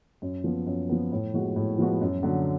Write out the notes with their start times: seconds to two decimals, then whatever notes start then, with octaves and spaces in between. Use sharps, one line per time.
0.22 F#2
0.44 F3 B3
0.66 F#2
0.89 F3 B3
1.12 A2
1.34 F3 G#3 B3 F#4
1.56 A2
1.78 F3 G#3 B3 F#4
2.02 F#2
2.23 D3 F#3